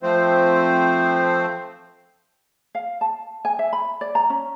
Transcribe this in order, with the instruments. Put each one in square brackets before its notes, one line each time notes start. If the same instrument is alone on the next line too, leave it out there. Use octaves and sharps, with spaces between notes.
[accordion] F3 A3 C4 C5
[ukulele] F5
A5
G#5
E5
B5
D5
A#5
C#4